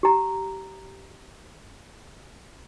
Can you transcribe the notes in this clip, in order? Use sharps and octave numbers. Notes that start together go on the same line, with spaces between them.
G4 A#5